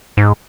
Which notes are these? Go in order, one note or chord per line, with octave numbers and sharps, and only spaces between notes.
G#2